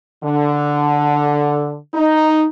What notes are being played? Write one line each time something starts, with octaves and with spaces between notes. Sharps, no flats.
D3
D#4